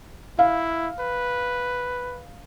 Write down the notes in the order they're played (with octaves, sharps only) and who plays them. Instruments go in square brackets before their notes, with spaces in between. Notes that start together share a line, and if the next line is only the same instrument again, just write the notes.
[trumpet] E4 [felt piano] F5
[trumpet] B4